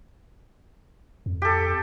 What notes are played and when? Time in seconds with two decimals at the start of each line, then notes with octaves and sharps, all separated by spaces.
1.26 F2
1.42 G4 A4